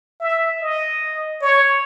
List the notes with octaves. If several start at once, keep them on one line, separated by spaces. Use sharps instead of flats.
E5
D#5
C#5